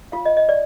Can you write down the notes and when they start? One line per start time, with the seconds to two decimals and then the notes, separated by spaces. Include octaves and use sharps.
0.12 F4 F5
0.25 D#5
0.37 D#5
0.49 D5